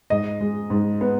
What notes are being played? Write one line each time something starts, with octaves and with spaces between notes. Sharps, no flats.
G#2 D#5
G#3
G#2
B3